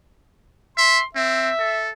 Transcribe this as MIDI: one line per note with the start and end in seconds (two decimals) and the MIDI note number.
0.77 1.00 76
0.77 1.04 84
1.15 1.50 60
1.15 1.89 76
1.59 1.91 69